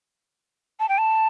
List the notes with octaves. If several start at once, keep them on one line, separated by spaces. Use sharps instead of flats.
A5
G5
A5